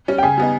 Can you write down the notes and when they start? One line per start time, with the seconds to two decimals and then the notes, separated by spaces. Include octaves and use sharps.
0.08 G3 C#4
0.18 G5
0.23 C#3 G#5
0.38 G3 B3 D#4